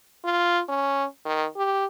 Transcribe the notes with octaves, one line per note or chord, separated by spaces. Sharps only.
F4
C#4
D#3
G4